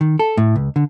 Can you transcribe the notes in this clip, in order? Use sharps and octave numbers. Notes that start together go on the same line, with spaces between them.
D#3
A4
A2
C#2
D3